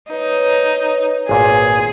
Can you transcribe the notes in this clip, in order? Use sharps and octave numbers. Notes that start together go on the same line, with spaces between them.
D#4 B4 C#5
G#1 A#2 G#4 G#5